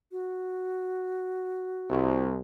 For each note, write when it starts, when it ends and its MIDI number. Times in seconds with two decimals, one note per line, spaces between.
0.12 2.23 66
1.90 2.38 36